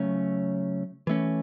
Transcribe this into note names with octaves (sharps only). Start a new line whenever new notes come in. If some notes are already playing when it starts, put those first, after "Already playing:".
Already playing: C#3 F#3 A3 C#4
E3 A3 C#4